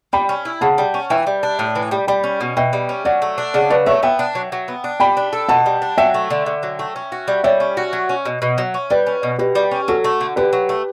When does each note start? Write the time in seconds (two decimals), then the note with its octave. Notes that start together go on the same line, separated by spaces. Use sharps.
0.13 G3 G5 B5
0.29 C#4
0.45 E4
0.61 C#3 F#5 A5
0.78 G3
0.94 C#4
1.10 E3 E5 G5
1.27 G3
1.43 D4
1.59 A2
1.75 E3
1.91 G3
2.07 G3 G5 B5
2.24 C#4
2.41 B2
2.57 B2 E5 G5
2.73 G3
2.89 C#4
3.05 F#3 D5 F#5
3.22 A3
3.38 D4
3.54 C#3 D5 F#5
3.70 F#3 B4 D5
3.86 A3 C#5 E5
4.03 B3 E5 G5
4.19 D4
4.35 F#3
4.52 F#3
4.68 B3
4.84 D4
5.00 G3 G5 B5
5.17 D4
5.33 A4
5.49 B2 F#5 A5
5.66 G3
5.82 D4
5.98 F#3 E5 G5
6.14 A3
6.30 D3
6.46 D3
6.63 F#3
6.79 A3
6.96 C#4
7.12 F#4
7.28 G3
7.44 G3 C#5 E5
7.60 C#4
7.77 F#4
7.93 F#3
8.09 C#4
8.25 B2
8.42 B2
8.58 F#3
8.74 C#4
8.90 G3 B4 D5
9.07 C#4
9.23 B2
9.39 B2 G4 B4
9.55 G3
9.71 C#4
9.88 F#3 F#4 A4
10.04 A3
10.21 D3
10.36 D3 G4 B4
10.53 F#3
10.69 A3